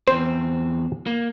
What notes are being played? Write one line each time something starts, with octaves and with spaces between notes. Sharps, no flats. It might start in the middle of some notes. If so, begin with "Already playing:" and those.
E2 C4 C5
A#3